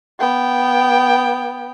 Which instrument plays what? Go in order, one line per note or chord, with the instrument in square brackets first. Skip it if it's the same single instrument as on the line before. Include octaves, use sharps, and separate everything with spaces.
[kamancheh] B3 G5